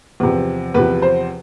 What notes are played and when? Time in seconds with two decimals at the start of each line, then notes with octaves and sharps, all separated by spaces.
0.20 E2 C3 F3
0.74 E2 C3 F3 B4
1.02 C5